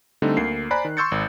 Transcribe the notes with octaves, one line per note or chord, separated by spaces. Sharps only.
D3 G3 A3 C4 D#4
D2 A#3 C7
C5 D5 G#5 A#5 B5 F#6
D#3
C6 C#6 E6 G6 A6 C#7
G#1